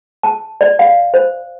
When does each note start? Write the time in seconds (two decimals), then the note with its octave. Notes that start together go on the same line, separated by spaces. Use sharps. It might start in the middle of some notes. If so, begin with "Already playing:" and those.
0.23 A5
0.61 D5
0.79 F5
1.14 C5